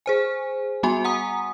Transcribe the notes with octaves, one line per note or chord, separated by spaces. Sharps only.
G#4 C5 G#5
G3 B3 F#4 G#5 C6
F#5 G#5 A#5 D#6